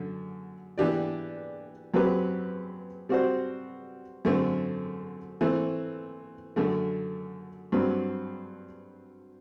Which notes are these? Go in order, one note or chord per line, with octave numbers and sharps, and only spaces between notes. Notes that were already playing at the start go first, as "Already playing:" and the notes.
Already playing: F#2 D3
E3 B3 D4 G4 D5
F#2 F#3 C4 G4 B4
G3 C4 F#4 C5
F#2 D3 A3 C4
E3 A3 C4
F#2 D3 A3
G2 F#3 C4